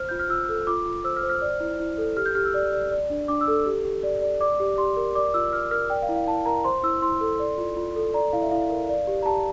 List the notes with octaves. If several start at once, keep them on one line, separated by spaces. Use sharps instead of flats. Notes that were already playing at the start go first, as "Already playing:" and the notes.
Already playing: C5 F6
F4 G6
F6
F4 E6
A4
F4 D6
F4
C5 E6
F6
C5
F6
D5
E4
E4
A4
G4 F6
G6
G4 F6
E6
D5
D5
D5
D4
D4 D6
E6
A4
G4
G4
D5
D5
D5 D6
G4
G4 C6
A#4
D5 D6
F4 E6
F4 F6
A#4 F6
D5 G5
F5
E4
F5
E4 A5
A#4 A#5
C5 C6
E4 E6
E4 C6
A4
D5
F4
F4
A4
D5 A#5
E4 F5
E5
E4 F5
A#4
D5
G4
A#5
G4 A5